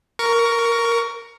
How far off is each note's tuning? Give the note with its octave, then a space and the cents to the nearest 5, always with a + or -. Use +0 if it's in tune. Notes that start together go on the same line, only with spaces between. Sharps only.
A#4 +0 C#6 +20